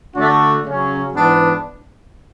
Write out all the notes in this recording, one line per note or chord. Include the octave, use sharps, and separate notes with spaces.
D3 A3 D4 F#4
C#3 F#3 C#4
G#2 E3 B3 D4